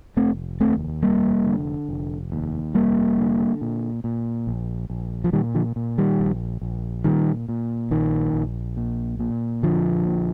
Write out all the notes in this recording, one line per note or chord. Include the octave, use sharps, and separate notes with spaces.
F1 A3 C4
D#2 A3 C4
F1 G3 A#3
D3
F1
D#2
F1 G3 A#3
D3
A#2
A#2
A#1
A#1
F3
A#2 D#3 G3
D3 F3
A#2
D#3 G3
A#1
A#1
A#2 D#3 G3
A#2
A#1 D#3
A#1
A#2
A#2
A#1 D3 F3
A#1